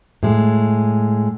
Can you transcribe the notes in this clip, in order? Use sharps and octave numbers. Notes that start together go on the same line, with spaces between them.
A2 G#3